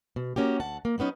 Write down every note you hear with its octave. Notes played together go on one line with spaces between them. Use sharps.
B2
A#3 C#4 F#4 G4
D2 F#5 A5
A#3
F#3 G#3 B3 C#4 D#4